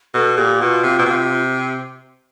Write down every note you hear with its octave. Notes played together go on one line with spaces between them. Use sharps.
B2 A4
A#2 G4
B2 F4
C3
B2
C3